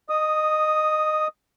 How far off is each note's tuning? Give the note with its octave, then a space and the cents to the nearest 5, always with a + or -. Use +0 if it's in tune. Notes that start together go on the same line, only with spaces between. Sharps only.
D#5 -20 D#6 +0